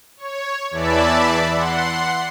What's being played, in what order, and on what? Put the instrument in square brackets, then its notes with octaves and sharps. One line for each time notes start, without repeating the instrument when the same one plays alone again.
[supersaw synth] C#5
E2 E3 D5 E5 A5 B5
F#5 C6